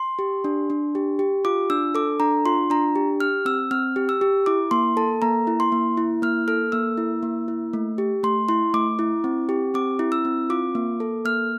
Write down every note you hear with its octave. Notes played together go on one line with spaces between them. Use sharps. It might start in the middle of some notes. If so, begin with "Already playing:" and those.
Already playing: C6
G4
D4
D4
G4
G4
F4 D6
D4 E6
A4 D6
D4 A#5
F4 C6
D4 A#5
G4
G4 F6
C4 E6
C4 F6
G4
E6
G4
E4 D6
A#3 C6
A4 A5
A#3 A#5
E4
C6
A#3
E4
A#3 F6
A4 F6
A#3 E6
E4
A#3
E4
A3
G4
A3 C6
E4 C6
A3 D6
E4
C4
G4
C4 D6
E4
E6
C4
F4 D6
A#3
A4
A#3 F6